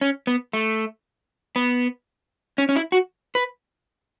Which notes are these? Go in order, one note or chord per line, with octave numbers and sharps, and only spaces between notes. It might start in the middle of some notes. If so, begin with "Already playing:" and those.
C#4
B3
A3
B3
C#4
C#4
E4
F#4
B4